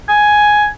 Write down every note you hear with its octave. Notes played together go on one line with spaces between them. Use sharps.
G#5